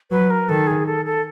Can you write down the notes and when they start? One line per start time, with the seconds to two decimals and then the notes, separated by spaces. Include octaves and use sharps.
0.11 F#3 B4
0.30 A#4
0.49 D#3 A4
0.67 G#4
0.86 A4
1.05 A4